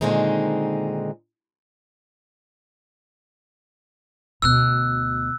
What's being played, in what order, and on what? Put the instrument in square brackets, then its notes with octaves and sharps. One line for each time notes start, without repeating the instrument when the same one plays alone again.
[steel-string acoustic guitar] A#2 D3 D#3 G#3 C4 D#4
[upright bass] D2 B2 [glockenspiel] E6 F#6